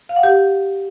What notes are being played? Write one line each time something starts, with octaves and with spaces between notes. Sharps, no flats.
F5
F#5
G4